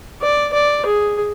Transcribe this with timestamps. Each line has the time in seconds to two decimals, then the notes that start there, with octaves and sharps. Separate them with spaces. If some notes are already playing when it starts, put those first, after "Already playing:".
0.22 D5
0.53 D5
0.86 G#4